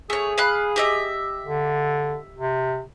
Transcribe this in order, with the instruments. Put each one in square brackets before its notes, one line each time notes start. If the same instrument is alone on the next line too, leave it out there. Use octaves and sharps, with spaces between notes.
[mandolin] A3 C#5 [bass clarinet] G#4
[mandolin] F5 B5 F#6
G4 D#5 E5
[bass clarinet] D3
C3